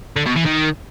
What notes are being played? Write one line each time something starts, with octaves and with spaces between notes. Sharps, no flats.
D3
B2
E3
D#3